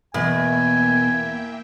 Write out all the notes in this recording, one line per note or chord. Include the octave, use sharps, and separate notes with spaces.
E2 B2 A#3 B3 E5 G5 G#5